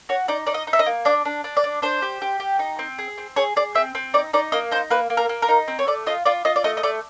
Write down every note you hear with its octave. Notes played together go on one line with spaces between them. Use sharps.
F#4 C#5
D#4 D5
D#4 D5
D#5
D#4
E5
D#5
A#3
D4 D5
D4
D4
D5
D4
D4 C5
G4
G4
G4
D#4
C4
G#4
C4
G#4 C#5
G#4 D5
C4 E5
C4
D#4 D5
D#4 D5
A#3 D#5
D#4 C5
A#3 B4
A#3
A#4
A#3
A#4
D#4
C4
C#5
A3 D5
F4 D#5
F4 D5
F4 D#5
D5
A3 D#5
D#5
A3 D5